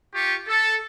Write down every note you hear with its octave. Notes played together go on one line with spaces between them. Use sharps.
F4 G4 C#6
A4